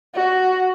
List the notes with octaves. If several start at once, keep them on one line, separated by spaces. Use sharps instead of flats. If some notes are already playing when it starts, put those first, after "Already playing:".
F#4